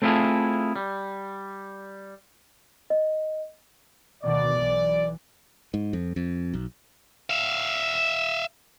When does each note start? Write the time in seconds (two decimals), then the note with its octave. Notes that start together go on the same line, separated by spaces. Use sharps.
0.02 A3 C4 E4 F4 G#4 A4
0.76 G3
2.90 D#5
4.24 D2 B2 D#3 D5
4.55 B1 E3
5.74 G#2
5.93 F2
6.16 F2
6.53 B1
7.30 E5 F5